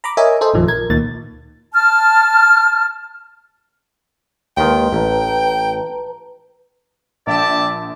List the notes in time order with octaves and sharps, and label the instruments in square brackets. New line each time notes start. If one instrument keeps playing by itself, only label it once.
[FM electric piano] A#5 B5 D6
A#4 C#5 D#5 E5 G#5
A4 C5 D#5
A#1 F#2 D#3 F3
A#4 G#6
D2 A#2 D#3 A6
[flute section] A5 F6
[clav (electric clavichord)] D#2 D#3 [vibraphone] G#3 B4 C6 [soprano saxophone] G5
[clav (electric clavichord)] A1 [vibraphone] B4 A5 A#5
[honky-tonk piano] A#1 [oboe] D5 [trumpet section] E5 G5 A5